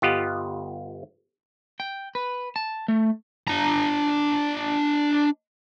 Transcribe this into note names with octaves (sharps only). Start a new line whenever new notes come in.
G1 B3 F4 G4 D#5 F#5
G5
B4
A5
A3
D4 A#5